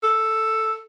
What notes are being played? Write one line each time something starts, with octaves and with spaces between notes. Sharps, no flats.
A4